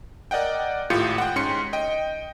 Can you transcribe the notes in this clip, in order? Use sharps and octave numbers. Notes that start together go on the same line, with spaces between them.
A#4 D5 D#5 F#5 G5
G#1 A2 F4 G4 G6 C#7
F#5 G5
G#2 C#4 C6 C#7
D#5 G5